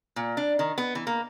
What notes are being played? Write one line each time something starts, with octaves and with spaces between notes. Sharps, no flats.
A#2
D4
D#3
B3
E3
A#3